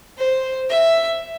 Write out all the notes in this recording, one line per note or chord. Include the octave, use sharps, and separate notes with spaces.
C5
E5